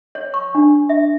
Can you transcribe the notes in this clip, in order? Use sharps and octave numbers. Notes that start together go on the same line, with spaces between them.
C#5
C#6
D4
E5